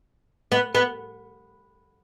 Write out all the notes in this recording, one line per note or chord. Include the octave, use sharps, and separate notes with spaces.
B3
B3